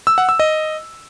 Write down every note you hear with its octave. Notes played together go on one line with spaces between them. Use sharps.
E6
F#5
E6
D#5